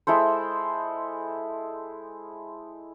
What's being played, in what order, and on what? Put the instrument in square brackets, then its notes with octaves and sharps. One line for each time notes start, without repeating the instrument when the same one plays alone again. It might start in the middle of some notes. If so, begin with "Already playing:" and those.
[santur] G#3 E4 A4 C5